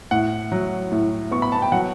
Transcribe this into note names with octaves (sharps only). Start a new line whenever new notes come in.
A2 F#5
F#3
A2
B3 C#6
B5
A5
G5
F#3 F#5